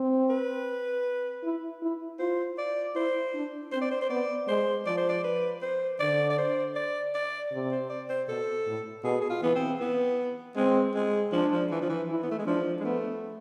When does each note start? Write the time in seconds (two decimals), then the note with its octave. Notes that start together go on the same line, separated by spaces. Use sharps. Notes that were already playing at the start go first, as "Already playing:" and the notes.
Already playing: C4
0.30 B4
1.43 E4
1.82 E4
2.19 F4 C5
2.58 D5
2.95 E4 C5
3.34 D4
3.72 C4 C5
3.81 D5
3.91 C5
4.01 C5
4.10 B3 D5
4.48 G#3 C5
4.86 F3 D5
4.97 C5
5.09 D5
5.24 B4
5.62 C5
6.00 D3 D5
6.30 D5
6.38 C5
6.76 D5
7.14 D5
7.52 C3
7.72 C5
7.90 D5
8.09 C5
8.28 B2 A4
8.66 A2
9.04 B2 G#4
9.21 G#4
9.30 F4
9.42 E3 B3
9.55 C4
9.81 B3
10.56 G#3 C4
10.95 G#3
11.32 F3 D4
11.52 F3
11.71 E3
11.82 F3
11.89 E3
12.09 E3 E4
12.23 B3
12.31 A3
12.39 G#3
12.46 F3 D4
12.80 G#3
12.84 A3 B3